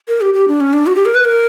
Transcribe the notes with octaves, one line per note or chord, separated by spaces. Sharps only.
A#4
G4
G4
D4
C#4
D4
F#4
G4
A#4
B4
A#4